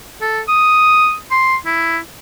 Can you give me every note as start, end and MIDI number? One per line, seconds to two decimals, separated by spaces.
0.21 0.42 69
0.49 1.15 87
1.31 1.56 84
1.66 1.99 64